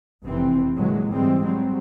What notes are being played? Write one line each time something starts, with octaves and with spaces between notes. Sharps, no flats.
F1 C3 E3 C4
A#2 D3 E3 F#3 G#3
G#2 E3 G3 G#3 C4
F#3 G3 C4